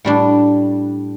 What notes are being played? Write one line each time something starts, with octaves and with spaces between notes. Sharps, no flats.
A2 G3 D4